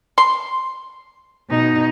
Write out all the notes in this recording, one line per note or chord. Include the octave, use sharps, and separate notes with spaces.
C6
B2 D#4